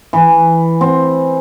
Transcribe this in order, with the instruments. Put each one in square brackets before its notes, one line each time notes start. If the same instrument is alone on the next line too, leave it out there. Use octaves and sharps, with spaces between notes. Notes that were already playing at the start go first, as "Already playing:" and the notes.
[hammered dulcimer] E3
C4